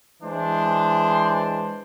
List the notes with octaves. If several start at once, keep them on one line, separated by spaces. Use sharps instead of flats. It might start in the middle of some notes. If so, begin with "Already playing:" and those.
E3 G#3 D4 C5